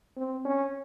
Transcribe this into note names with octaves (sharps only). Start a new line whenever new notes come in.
C4
C#4